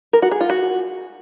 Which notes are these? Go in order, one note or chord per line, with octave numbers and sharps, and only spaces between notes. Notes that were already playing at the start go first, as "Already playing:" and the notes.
A#4
F#4
G#4
F4
F#4